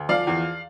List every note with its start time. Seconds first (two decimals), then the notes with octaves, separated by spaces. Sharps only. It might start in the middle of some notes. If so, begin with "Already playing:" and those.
Already playing: D2
0.09 F3 D5 F5
0.27 E2